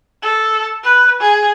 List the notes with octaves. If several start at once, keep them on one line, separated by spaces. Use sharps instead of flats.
A4
B4
G#4